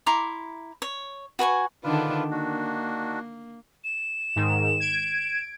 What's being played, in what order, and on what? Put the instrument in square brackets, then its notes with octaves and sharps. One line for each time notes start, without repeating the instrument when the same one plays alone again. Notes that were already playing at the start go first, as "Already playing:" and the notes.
[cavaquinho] E4 A#5 C6 D6
C#5
F#4 B4 G#5 C#6
[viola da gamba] D3 D#3 D4 [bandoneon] F4 B4
[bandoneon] D#3 D4 F#4 [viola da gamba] A#3
[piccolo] E7
[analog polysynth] G#2 D#3
G#6 D7